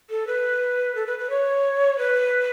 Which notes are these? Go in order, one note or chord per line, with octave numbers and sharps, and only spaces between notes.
A4
B4
A4
B4
B4
C#5
B4